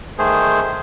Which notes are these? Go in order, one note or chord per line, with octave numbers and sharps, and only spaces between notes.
D#3 A3 G#4 C5